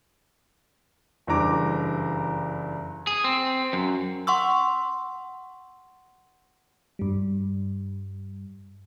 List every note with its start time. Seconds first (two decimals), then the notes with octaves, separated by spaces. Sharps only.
1.27 F#1 G2 E3 A#5 D6
3.07 G#4
3.24 C4
3.73 F#2
4.27 F#5 C6 C#6 E6
6.99 G2 G3